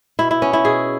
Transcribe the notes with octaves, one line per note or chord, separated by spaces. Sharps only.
B2 E4
E4
B3 C#4
E4
B2 G#4